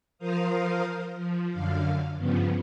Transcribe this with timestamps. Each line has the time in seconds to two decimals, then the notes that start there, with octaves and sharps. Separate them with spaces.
0.18 F3 A#4 C5 F5 D#6
1.15 F3
1.49 F#2 D3 F5
2.16 G2 C#3 F3 B3